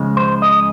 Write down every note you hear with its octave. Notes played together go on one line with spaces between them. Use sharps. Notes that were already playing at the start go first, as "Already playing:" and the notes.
Already playing: C#2 C#3 F3 G#3
C5
D#5